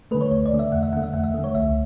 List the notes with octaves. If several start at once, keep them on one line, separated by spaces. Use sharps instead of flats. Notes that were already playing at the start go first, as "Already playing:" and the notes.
D3 A3 B4
C#5
D2 C#5
D5
D3 A3
E5
E2 F#5
E5
D3 A3 F#5
E5
E2 F#5
E5
D3 A3
C#5
C#2 E5